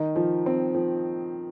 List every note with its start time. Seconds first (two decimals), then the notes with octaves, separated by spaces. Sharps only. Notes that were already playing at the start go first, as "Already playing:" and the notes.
Already playing: D#3 D#4
0.16 F3
0.46 C4
0.75 F3